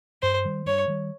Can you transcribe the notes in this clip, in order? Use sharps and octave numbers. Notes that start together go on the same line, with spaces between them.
G2 C5
D#3 G3
G2 C#5
D#3 G3